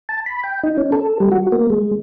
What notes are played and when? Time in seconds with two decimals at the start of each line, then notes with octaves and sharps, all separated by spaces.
0.09 A5
0.26 B5
0.44 G5
0.63 D#4
0.78 C#4
0.92 A4
1.20 G3
1.32 F#4
1.52 A#3
1.70 G#3